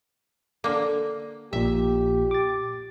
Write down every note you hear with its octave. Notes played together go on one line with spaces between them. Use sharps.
D3 A#3
A#1 A#2 G4 E5
D6 A6